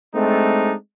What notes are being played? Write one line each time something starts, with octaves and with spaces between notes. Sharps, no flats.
G#3 A3 C4 D4 D#4